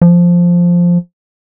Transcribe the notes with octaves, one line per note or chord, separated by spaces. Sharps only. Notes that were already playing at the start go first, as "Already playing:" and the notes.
F3